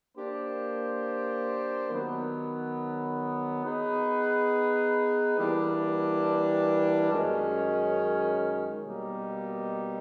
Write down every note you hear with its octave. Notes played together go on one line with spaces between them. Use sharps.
A#3 D4 G4 C5
D#3 F#3 B3
B3 D#4 G#4 B4
E3 G3 A#3 D4
F#2 D#3 G#3 C#4
B2 G3 A#3 D#4